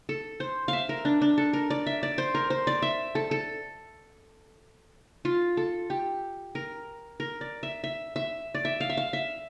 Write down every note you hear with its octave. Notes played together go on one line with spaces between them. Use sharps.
A4
C5
E5 F5
A#4
D4
D4
A4
A#4
D5
E5
D5
C5
A#4
C5
D5
E5
A4
A4
F4
A4
G4
A#4
A#4
D5
E5
E5
E5
D5
E5
F5
E5
F5
E5